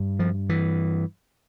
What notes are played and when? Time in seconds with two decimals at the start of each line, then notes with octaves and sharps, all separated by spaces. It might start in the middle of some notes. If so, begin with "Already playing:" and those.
Already playing: G2
0.19 F3
0.49 E3